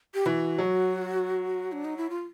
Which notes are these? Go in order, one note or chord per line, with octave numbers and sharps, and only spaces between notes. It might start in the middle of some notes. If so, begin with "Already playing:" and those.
G4
E3 F#4
F#3
D4
D#4
E4
F4